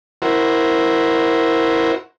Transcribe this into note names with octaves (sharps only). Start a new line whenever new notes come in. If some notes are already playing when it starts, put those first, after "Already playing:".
E4 F#4 A#4 C5